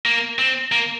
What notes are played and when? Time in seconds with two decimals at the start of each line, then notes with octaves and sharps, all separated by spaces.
0.06 A#3
0.39 C4
0.72 A#3